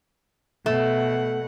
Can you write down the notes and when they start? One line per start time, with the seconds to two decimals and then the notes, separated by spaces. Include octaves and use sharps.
0.66 B2 A3 F#5